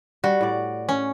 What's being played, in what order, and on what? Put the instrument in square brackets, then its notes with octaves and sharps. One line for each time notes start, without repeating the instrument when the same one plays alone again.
[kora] G3 [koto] F#4
[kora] A2 D5
[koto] C#4